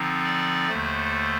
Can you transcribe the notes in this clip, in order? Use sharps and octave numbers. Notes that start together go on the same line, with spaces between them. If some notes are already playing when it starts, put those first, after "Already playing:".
Already playing: D3 F3 C4 D#4
D5
D#2 D3 A3 C5